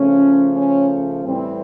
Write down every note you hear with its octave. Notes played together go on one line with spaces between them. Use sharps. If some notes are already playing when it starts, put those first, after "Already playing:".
Already playing: C#3 F3 A3 C#4
C#4
A2 E3 G3 C4